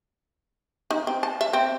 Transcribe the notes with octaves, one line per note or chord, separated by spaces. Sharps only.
D#4
C4
A5
E5
C4